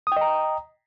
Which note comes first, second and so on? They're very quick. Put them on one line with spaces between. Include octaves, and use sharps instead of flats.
D#6 G5 D#5 A#5